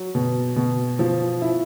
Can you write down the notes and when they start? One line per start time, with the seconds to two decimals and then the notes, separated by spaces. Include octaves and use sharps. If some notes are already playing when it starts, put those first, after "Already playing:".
Already playing: F#3
0.15 B2
0.56 B2
0.99 F3
1.42 E4